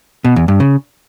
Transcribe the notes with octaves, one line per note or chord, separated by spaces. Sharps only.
B2
E2
G2
C#3